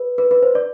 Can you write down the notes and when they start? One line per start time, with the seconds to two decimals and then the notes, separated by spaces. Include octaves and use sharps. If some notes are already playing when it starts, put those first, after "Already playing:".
Already playing: B4
0.18 B4
0.31 B4
0.43 C5
0.55 D5